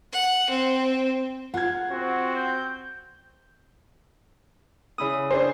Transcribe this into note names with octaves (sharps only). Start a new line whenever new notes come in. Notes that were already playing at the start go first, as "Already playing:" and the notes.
F#5
C4
F4 G#4 A#4 F#5 G#6
C4 F#4
G6
C#3 E4 D#6
D4 G#4 C5